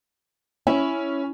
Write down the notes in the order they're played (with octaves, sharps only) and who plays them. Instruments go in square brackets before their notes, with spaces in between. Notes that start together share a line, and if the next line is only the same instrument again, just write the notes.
[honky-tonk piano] C#4 [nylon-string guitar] E4